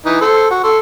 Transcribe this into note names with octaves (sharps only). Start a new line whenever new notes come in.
E3 D#4
A4 C5 C6
F#4
A4 C6